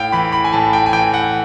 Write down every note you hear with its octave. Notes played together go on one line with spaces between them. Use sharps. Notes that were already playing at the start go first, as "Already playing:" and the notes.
Already playing: A2 F5 G5
E3 B5
B5
G#5
A2 A5
G5
G#5
E3 G5
F#5